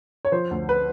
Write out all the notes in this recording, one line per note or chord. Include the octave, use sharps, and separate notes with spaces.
C#5
F3 C5
D2
B4